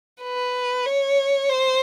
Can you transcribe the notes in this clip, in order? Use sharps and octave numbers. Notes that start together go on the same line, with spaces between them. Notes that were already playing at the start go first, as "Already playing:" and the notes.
B4
C#5
C5